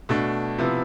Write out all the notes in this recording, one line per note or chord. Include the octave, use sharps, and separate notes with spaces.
B2 A3 D4
C3 F3 B3 E4